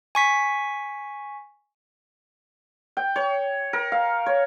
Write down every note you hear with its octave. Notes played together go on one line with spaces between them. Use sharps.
G#5 C#6 B6
G5
C#5
A#4
F5
C#5